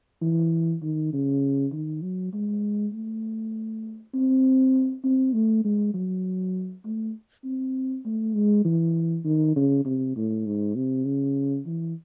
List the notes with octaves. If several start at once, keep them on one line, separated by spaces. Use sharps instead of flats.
E3
D#3
C#3
D#3
F#3
G#3
A3
C4
C4
A3
G#3
F#3
A3
C4
A3
G#3
E3
D#3
C#3
C3
A2
G#2
C3
C#3
E3